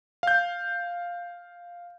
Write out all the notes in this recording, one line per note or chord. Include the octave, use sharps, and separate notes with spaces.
F5 G6